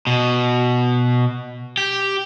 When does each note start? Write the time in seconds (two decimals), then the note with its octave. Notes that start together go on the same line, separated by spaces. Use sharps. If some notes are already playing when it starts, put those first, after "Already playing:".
0.07 B2
1.77 G4